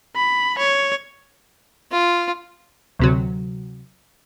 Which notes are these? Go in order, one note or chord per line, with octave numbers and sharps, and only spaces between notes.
B5
C#5
F4
D2 C3 F#3